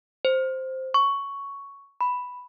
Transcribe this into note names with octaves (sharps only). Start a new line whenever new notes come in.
C5
C#6
B5